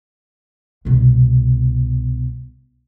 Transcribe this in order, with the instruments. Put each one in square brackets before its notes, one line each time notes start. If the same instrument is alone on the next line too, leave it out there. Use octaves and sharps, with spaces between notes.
[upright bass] C2 B2